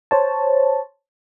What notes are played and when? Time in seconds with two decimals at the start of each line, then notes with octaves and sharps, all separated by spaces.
0.11 C5 C#5 A5